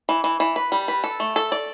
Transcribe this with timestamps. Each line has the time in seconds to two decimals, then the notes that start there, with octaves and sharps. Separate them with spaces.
0.09 E3
0.24 E3
0.40 E3
0.56 B4
0.72 G3
0.88 B4
1.04 A4
1.20 A3
1.36 A4
1.52 D5